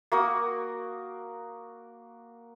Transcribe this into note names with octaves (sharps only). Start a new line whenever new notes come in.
A#3 F#4 D#6